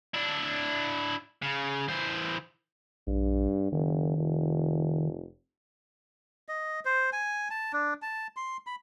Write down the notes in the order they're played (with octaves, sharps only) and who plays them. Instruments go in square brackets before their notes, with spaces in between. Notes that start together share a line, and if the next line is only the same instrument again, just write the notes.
[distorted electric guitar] D4 E4
C#3
E3 C5
[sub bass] A#1 [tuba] G2
[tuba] F#1 [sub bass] D#3
[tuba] F1
[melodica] D#5
C5
G#5
A5
D4
A5
C6
B5